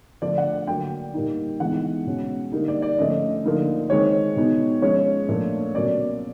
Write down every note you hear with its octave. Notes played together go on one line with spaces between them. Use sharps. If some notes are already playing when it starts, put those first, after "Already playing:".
D3 F3 A3 D4 D5
F#5
D3 F#3 A#3 G5
A#2 G3 A#3 D#4
E3 G#3 B3 D#4 F#5
B2 G#3 C#4
D3 G3 A#3 D#4
D5
D5
D3 F3 A3 C#4 D#5
D3 F3 A#3 D#4
D#3 G#3 C4 C#5
B2 G#3 B3 D#4
F3 G#3 C#4 C#5
A#2 F3 A3 D4
B2 F#3 A#3 C#4 D5